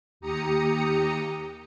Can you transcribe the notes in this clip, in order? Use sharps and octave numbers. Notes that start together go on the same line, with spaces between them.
D#2 G4 A#5 D#6 C#7